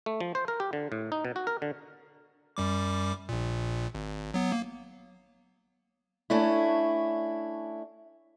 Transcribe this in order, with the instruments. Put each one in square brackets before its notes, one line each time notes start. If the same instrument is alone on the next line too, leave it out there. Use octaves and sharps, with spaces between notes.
[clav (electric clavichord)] A3
F3
C5
A#4
G4
D3
A2
D#4
B2
F#4
A#4
D3
[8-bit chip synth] F#2 G3 D6
A#1 A#2
G#1
F#3 B3
A#3
[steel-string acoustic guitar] A3 C#4 D4 E4